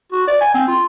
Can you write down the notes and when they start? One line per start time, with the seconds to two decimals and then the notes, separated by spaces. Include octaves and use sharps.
0.12 F#4
0.28 D5
0.41 G#5
0.54 C4
0.68 F4